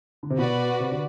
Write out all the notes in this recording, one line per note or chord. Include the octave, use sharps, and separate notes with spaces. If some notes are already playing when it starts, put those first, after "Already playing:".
D3
C3
B2 F#4 B4 D5
C3
D3